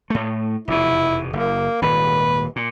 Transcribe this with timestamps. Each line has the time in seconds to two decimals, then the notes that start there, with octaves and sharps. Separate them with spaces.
0.10 A2 A3
0.68 F1 E2 B2 E4
1.33 F#1 A#3
1.82 D#1 D#2 G#2 B4
2.56 A#2